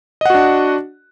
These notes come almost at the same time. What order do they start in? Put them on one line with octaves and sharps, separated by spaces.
D#5 F#5 F#4 D4